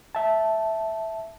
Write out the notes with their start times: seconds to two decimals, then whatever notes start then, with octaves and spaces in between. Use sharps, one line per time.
0.15 E5 A5